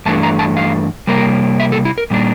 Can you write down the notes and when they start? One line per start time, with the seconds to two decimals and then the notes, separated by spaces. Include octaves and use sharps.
0.06 G2 E3 A3 D4 A5
0.23 A#5
0.39 A5
0.57 F5
1.07 C3 G3 A#3 A#4
1.60 E5
1.72 A4
1.85 E4
1.98 A#4
2.10 A#2 G3 A#3 D4